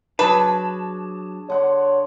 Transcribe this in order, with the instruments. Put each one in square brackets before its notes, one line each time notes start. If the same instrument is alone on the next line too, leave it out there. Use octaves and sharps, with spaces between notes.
[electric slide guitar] F#3 A5 [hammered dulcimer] D4 G#4 [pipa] B4
[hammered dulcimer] D3 F#5 C6 [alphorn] C#5